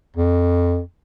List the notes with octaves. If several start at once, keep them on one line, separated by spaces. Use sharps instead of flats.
F2